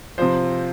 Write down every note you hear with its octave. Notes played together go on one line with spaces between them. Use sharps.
C3 F3 C5